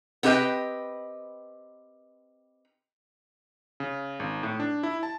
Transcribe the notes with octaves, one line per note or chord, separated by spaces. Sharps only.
B3 C4 G4 B4 D#5 G5
C#3
G#1
A2
D4
E4
A5